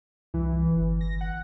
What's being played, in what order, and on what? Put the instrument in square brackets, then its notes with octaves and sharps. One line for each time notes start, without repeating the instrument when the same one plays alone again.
[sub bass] C2 [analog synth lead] E3
[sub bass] G1
[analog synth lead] A#6
F#5